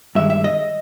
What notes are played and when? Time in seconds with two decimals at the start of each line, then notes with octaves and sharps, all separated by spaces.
0.15 G2 D#3 G#3 E5
0.30 E5
0.44 D#5